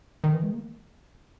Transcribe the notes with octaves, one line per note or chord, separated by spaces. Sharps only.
D#3
E3
G#3
A#3